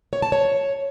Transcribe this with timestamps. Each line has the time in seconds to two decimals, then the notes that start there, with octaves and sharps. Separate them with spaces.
0.13 C#5
0.22 A5
0.32 C#5